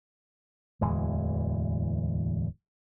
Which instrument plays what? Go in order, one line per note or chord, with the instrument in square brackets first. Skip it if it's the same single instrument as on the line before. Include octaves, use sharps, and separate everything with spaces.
[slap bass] D1 E2 E3 G#3